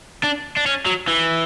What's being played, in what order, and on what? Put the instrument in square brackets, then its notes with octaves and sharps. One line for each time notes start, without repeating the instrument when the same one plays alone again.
[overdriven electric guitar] D4
D4
C#4
F#3
E3